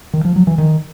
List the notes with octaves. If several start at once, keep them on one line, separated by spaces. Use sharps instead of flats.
D#3
F3
F#3
E3
D#3